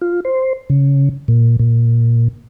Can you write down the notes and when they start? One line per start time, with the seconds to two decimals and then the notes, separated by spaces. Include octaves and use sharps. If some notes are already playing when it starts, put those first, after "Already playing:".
0.01 F4
0.25 C5
0.70 C#3
1.28 A#2
1.59 A#2